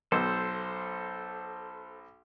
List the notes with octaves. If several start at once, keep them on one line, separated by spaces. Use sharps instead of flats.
B1 A4 C5